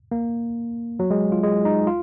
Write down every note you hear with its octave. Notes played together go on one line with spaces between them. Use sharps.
A#3
F#3
G#3
F4
G#3
D#4
F4